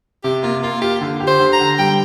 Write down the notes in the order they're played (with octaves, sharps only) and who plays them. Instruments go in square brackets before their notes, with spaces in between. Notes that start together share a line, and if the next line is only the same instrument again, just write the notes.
[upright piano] C3 [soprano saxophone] G4
[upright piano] A#3 [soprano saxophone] F4
[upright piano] A#3 [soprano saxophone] F4
[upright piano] F4 [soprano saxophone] G4
[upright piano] D3
G4
[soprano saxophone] C5
[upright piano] D3
[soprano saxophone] A#5
[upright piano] D3
[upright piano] G3 [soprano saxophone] G5